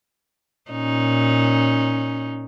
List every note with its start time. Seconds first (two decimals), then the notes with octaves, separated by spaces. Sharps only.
0.71 A#2 C#4 D#4